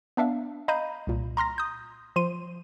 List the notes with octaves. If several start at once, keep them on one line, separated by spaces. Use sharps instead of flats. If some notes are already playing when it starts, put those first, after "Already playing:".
B3 D4 E5 F5
D#5 F5 A#5 B5 G6 D#7
C2 A#2
A#5 C6 F6 A#6
D#6 G6
F3 C6 D#7